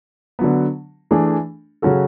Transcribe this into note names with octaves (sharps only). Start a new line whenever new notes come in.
D3 F#3 B3
E3 A3 D4 G#4
C#3 F#3 C#4 F#4 A4